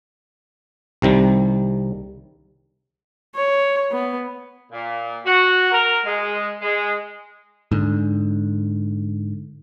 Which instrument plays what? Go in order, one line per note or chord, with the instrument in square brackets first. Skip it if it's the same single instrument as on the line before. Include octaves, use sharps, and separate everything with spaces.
[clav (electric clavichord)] C2 C3 D#3 G3
[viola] C#5
B3
[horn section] A#2
F#4
A#4
G#3
G#3
[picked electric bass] G#2 D3